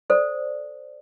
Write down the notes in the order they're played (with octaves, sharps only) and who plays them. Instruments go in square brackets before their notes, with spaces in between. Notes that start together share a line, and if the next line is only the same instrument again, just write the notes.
[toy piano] A4 C5 D5